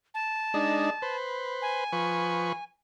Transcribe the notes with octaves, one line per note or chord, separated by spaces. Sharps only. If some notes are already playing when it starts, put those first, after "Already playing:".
A5
G#3 D4 D#4
B4 C5
G#5
F3 B4 C#6